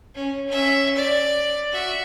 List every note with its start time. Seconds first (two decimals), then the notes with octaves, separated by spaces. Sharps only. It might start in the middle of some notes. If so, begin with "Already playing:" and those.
0.15 C#4
0.48 C#4 E5
0.96 D5
1.72 F#4 E5